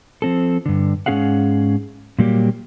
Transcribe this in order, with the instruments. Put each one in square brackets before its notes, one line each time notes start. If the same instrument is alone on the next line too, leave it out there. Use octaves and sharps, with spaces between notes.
[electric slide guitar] F3 C4 A4
G2 D3
G#2 F3 C#4 G#4 F5 F#5
A#2 F#3 G3 A#3 G4